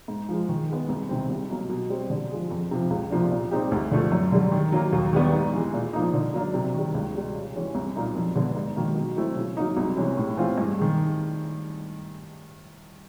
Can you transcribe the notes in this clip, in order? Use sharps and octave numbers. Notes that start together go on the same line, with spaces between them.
G#2
F3 G#3
D#3
G#3 B3
C2
C3 D#3 G#3 C4
C2
B2 F#3 A#3
B2
G3 C4
D3
F3 G#3
F2
C3 F3
C#2
C3 F3 A#3 D4
A#2
G3 C4 D#4 G4
D2
D3 F3 A3
F#2
D3 G3
D#3
F#3 A#3
D#2
D#3 G3 B3 D4
G#2
E3 G#3
A#2
F3 A#3 D#4
D3
F#3 A#3 D4
C3
D#3 G3
C#2
B2 G3
C#3
E3 G#3 C#4
C2
A#2 F#3 A#3 D#4
F2
D3 G3 B3 D4
G#2
D#3 F#3 A#3
B2
F#3 A3 C4 E4
C#3
F#3 A#3 D#4
C2
C3 E3 G#3 C#4
A2
E3 G#3 C4 F4
G2
D#3 G#3